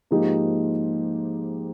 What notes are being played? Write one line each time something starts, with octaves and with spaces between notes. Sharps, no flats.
G#2 F3 A#3 D#4 G4